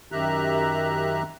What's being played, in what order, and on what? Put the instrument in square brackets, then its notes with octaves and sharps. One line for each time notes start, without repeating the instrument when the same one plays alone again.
[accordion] F#2 D#3 G4 E5 A#5 F#6